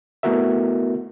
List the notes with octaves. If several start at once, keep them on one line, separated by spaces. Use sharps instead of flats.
A3 B3 E4 F#4 A#4 E5